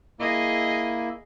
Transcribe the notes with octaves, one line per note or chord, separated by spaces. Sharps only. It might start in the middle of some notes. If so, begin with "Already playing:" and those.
A#3 E4 G#4 D#5